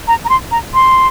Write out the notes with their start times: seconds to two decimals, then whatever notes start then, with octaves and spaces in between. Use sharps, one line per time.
0.08 A#5
0.25 A#5
0.29 C6
0.51 A#5
0.74 C6